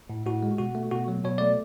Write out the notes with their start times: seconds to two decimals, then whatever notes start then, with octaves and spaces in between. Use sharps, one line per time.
0.10 A2
0.26 A2 F#4
0.43 G#3
0.59 B2 F#4
0.75 A3
0.91 B2 F#4
1.08 F#3
1.24 B2 C#5
1.38 A3 D5